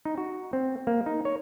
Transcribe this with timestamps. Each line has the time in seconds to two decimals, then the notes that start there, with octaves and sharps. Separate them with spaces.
0.05 D#4
0.18 F#4
0.53 C4
0.87 A#3
1.06 D#4
1.25 C#5